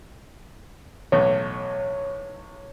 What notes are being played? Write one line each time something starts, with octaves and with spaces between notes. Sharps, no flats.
B1 E2 A2 C#5